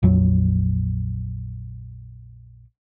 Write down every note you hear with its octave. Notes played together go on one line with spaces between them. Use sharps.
A#1 F2 F#3